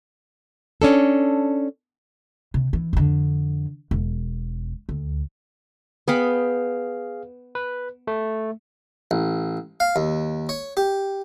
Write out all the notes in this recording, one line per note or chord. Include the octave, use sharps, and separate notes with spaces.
C#4 D4 A4
C3
E3
F2 D3
E1
D2
B3 G#4 F5 G5 B5
B4
A3
A1
F5
D#2
C#5
G4